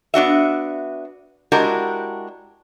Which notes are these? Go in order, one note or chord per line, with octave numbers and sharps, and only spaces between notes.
B3 D4 F#4 E5
G#3 D4 E4 F#4 G4 A#4